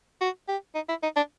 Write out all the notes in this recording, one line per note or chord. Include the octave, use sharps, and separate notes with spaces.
F#4
G4
D#4
E4
D#4
D4